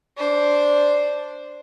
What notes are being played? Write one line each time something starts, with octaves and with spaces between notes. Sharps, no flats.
D4 C5